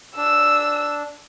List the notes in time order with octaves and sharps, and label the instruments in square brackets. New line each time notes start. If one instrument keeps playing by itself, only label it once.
[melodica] D4 [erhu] E6